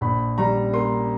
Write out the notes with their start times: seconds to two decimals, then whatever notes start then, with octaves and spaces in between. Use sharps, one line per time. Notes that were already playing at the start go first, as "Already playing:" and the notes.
0.01 A#1 B5
0.38 G3 A#5
0.73 A#3 C6